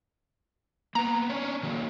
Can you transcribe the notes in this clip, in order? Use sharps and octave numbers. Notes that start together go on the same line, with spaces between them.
A#3 B3 A#5
C#4 D4 C#5
D#3 F#3 A#3